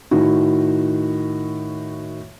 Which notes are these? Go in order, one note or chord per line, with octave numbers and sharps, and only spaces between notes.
A2 D#3 F#4